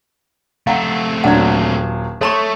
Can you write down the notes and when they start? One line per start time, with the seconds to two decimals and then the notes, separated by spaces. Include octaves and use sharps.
0.67 A3 C4 F5 F#5 A#5
1.24 D#1 F#3 D4 F#5 G#6
2.21 A3 A4 C#5 A#5 C#6